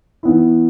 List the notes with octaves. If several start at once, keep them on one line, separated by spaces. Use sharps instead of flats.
E3 B3 E4